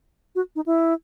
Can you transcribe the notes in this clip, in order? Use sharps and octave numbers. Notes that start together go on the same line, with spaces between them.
F#4
D#4
E4